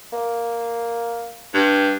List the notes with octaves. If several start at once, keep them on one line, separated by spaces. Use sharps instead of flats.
A#3
G2